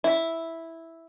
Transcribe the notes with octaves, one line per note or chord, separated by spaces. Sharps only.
E4